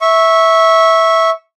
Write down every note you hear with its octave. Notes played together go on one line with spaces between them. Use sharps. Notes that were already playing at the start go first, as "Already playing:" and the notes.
E5 C#6